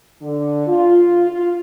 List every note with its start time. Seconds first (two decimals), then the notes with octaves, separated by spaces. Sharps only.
0.22 D3
0.67 F4
1.29 F4